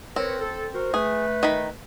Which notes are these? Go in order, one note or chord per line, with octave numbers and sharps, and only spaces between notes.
C4 A#4 B4 C#5
A4
F#4 A#4 C5
A3 G#4 B4
D#3 B5